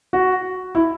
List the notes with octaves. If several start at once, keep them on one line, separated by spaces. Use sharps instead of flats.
F#4
E4